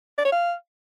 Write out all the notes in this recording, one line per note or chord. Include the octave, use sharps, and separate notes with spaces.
D5
C#5
F5